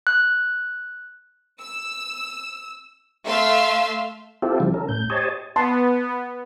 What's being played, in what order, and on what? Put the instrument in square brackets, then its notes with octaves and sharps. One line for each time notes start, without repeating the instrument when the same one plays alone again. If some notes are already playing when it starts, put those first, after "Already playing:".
[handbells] F#6
[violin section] E6
A3 E5 F5 C6 E6
[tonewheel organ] C4 E4 F4 G4 A4
C#3 F3 G3
C#4 A4 A#4
A2 G6
G4 C5 C#5 D#5 G#5 A5
[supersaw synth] B3 [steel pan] A5 C6